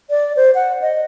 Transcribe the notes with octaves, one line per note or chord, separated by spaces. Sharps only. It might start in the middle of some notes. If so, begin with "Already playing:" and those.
D5
C5
F#5
D#5